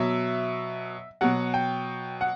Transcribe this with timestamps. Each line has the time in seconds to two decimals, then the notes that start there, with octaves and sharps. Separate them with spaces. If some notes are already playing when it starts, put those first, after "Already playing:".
Already playing: B2 F#3 E5
1.21 B2 F#3 F#5
1.54 G5
2.21 F#5